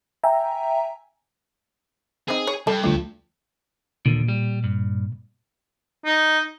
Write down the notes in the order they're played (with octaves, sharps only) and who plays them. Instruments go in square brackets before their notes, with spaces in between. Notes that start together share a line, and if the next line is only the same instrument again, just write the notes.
[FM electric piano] E5 G5 G#5 A#5
[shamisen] C4 D#4 [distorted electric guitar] G#4
[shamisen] C#5
[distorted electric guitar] G2 [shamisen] A4 A5
[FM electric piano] D2 F3 A3 [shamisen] D4
[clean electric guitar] D#2 D3 [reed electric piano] A#2
[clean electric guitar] G3
G2
[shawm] D#4